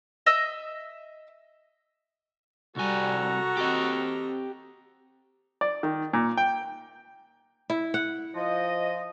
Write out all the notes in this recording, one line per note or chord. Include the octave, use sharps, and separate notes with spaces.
D#5 E5 E6
C2 G3 F#4 A4 G#5 A#5
C4 G4 D#5
D5
D#3
A#2
G5
E4
F#5
F3 D#5